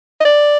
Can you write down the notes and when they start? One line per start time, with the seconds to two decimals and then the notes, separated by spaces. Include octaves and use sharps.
0.20 D#5
0.25 D5